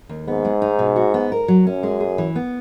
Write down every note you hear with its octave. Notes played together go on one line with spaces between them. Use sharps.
D#2
G#2 B3
G#3
D#4
B2
F#4
B3
A#4
F#3
F#2 C#4
G#3
G#4
E3
B3